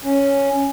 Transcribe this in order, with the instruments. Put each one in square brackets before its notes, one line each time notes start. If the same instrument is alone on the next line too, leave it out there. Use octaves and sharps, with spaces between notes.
[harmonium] C#4